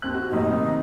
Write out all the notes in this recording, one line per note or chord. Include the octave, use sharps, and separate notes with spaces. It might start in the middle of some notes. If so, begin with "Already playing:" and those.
D#2 C4 F#6
F#4
F1 A#2 D#4 G4
C3 D#3